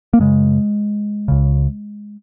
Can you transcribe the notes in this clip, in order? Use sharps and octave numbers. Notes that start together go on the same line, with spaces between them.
A#3
F#2 C#3 G#3
C#2 C#3